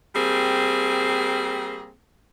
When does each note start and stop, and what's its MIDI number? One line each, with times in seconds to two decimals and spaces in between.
0.15 1.91 55
0.15 1.91 58
0.15 1.91 60
0.15 1.91 68